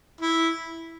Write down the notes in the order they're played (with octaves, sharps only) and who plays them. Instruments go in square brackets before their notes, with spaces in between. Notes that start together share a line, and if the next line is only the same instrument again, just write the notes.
[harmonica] E4